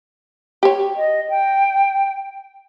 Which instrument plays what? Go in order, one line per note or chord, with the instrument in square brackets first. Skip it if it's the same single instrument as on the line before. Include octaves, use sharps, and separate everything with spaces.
[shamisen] G4 C#5
[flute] D#5
G5